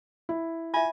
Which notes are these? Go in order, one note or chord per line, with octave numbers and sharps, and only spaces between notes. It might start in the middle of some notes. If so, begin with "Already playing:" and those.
E4
F4 E5 G#5